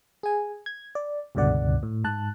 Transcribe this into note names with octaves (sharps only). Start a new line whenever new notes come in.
G#4 G#5
G#6
D5
C#2 G2 B2 D3 D5 F#5
A2
G#2 A5 F#6